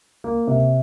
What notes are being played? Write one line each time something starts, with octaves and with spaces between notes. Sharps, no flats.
A#3
C3